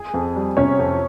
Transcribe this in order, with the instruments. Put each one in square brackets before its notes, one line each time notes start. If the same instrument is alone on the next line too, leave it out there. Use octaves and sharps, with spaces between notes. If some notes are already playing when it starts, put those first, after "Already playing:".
Already playing: [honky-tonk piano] G#4 G#5
[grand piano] F2
G3
[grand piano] C3 [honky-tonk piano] C#4 C#5
[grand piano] F2